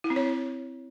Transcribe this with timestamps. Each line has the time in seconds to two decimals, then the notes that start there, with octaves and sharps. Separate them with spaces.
0.04 E4
0.10 C4
0.16 C#5